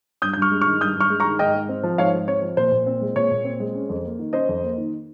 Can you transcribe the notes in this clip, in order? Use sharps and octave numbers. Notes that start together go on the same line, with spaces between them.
G2 D#6 G6
G6
G2
C#6 F6
G#3
C#6 F6
D#3
G2 D#6 G6
G2
C#6 F6
G#3
A#5 C#6
D#3
G#2 D#5 G5
G#2
C4
F3
G#2 C#5 F5
G#2
C4 C#5
F3
A#2 C5
A#2
C4
G#3
A#2 C#5
A#2
C4
G#3
C#4
F2
A#3
D#3
C#4 C5 D#5
F2
A#3
D#3